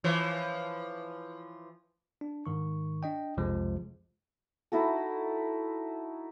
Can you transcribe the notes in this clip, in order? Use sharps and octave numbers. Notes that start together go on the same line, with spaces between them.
E3 F3 C#5
D4
G#2 D#3 C#6
D4 D#5 G5
B1 F2 C3 F3 G#3
D#4 E4 F#4 A4